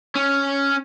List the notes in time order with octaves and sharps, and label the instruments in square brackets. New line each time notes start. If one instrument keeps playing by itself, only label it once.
[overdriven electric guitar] C#4